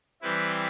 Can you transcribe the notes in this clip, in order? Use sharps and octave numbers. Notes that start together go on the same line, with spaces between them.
E3 G3 C4 E4 B4